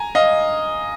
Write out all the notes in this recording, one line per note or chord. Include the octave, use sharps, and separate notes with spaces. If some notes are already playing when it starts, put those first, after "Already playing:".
Already playing: G#5 A#5
D#5 F5